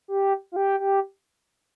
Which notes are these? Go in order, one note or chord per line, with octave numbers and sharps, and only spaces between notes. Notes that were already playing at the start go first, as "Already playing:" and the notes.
G4
F4
G4
G4